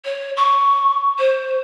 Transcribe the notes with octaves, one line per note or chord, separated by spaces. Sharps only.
C#5
C#6
C5